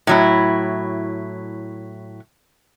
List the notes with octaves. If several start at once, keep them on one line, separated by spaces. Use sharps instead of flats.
A2 F#3 E4